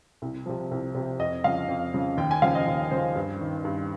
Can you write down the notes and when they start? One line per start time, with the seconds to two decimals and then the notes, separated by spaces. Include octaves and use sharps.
0.22 C2
0.46 C3 F3
0.71 C2
0.95 C3
1.00 F3
1.19 F2 D#5
1.44 C#3 F3 F5
1.68 F2
1.94 C#3 F3
2.17 D#2 G5
2.31 G#5
2.42 C#3 F3 F5
2.55 D#5
2.68 D#2
2.91 C#3 F3 C5
3.16 G2
3.41 D#3
3.65 G2